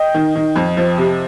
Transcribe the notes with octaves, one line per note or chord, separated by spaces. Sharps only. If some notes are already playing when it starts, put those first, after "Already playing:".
Already playing: D#5 G5
D#3
D#3
F2
F3
C3